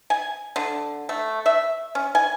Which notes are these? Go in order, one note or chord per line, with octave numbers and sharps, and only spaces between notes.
G#5
D3
A3
E5
C#4
G#5